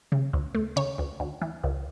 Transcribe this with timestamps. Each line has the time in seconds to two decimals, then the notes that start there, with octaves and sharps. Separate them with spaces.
0.12 C#3
0.33 D2
0.55 A3
0.76 C#3 C#5
0.98 D2
1.20 D2
1.42 E3
1.63 C#2